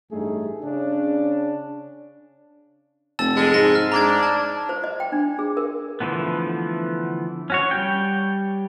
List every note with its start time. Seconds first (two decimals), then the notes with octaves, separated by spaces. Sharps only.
0.10 A1 G2 A3 D#4 G#4
0.62 C#3 C#4 D4
3.19 F1 A5 E6 A6
3.36 G#3
3.54 G#2 A#6
3.75 F6
3.92 D4 A#5 G#6
4.23 A5
4.69 C5
4.84 D#5
5.00 G5
5.12 D4
5.39 G#4
5.57 A#4
6.00 D3 E3 F3 A3 B3
7.50 C#4 F#4 C#5
7.71 G3 C#5 G5